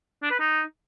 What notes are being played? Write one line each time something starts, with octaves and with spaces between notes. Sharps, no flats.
D4
B4
D#4